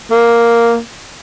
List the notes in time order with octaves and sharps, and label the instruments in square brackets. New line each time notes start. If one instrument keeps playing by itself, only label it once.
[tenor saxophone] A#3